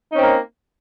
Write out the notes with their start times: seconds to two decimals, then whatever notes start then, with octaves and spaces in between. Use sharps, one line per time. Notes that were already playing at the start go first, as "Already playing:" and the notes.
0.11 D#4
0.15 C#4
0.18 C4
0.22 A#3